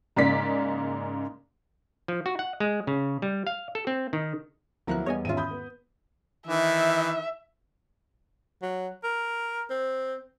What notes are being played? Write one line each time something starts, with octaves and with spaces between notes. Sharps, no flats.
G#2 C#3 A#3 D5 B6
F3
F#4
F#5
G#3
C#3
G3
F5
A4
C4
D#3
D2 F3 F#3 A#3 B3 E4 A#5 F#6
E2 G3 B3 C#5 D#5 G#5
G#2 D#3 C#4 F4 E5 D#7
B5 D#6 G6
B3
D#3 E3 E5
F#3
A#4
C4